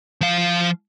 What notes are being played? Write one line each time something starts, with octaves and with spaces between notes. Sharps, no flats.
F3 F5